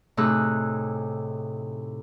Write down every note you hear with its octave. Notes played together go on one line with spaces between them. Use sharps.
A2 C3 D#4 G#4 E6 F#6